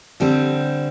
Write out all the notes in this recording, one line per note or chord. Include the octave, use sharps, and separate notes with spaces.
D3 G3 C4